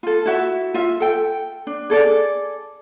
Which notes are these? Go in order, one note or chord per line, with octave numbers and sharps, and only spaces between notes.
F4 A4
E4 F#4 E5
F4 E5
A4 G5
D4
G#4 A4 C#5 D5